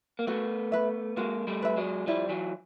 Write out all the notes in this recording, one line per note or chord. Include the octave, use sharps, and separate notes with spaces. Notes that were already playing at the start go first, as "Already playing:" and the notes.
A#3
A3 B3 F#4
B4 E5
G#3 A#3 F#4
G3 A3
B4 E5
F#3 G#3
F3 G3 E4
E3 F#3